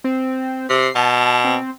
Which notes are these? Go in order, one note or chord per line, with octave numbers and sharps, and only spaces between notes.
C4
C3 C7
B2 A5
C4